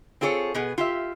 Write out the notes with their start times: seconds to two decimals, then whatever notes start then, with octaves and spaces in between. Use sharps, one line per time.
0.21 C4 F4 G#4 A4 C#5
0.54 B2 B3 G#4
0.78 F4 G4 E5